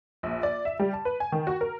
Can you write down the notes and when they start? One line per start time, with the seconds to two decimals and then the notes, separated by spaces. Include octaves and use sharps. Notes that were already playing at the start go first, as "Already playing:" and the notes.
0.23 A#1
0.43 D5
0.65 E5
0.79 G3
0.93 A5
1.05 B4
1.20 G#5
1.32 D#3
1.47 F#4
1.61 A#4